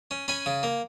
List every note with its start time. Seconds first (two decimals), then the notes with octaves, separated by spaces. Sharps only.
0.11 C#4
0.28 C#4 G#5 B5
0.46 C#3
0.63 A#3